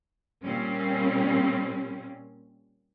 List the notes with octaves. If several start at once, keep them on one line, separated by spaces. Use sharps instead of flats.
A#2 G3 C4 C#4